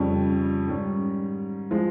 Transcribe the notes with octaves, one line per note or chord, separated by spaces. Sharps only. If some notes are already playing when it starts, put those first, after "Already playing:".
Already playing: F2 C#3 G3 C#4
G#2 D#3 G3 C#4
F3 G#3